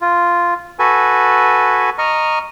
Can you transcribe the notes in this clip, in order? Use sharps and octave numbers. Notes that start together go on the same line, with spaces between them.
F4
F#4 A4 B4 G#5
D#5 A#5 C#6 F6